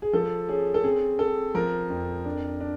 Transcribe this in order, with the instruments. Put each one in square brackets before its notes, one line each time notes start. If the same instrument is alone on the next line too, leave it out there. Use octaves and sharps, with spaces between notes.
[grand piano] G#4
F3 A4
C#4 G#4
A4
C4 G#4
C4 A4
F3 A#4
F2
D4
D4